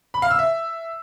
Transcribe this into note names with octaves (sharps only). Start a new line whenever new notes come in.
B5
F5
E6
E5